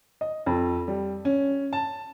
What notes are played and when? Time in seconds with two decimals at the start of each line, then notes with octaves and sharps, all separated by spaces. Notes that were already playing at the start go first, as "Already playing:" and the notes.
0.21 D#5
0.46 F2
0.88 G3
1.25 C#4
1.73 A5